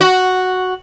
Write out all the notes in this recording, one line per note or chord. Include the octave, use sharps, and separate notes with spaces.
F#4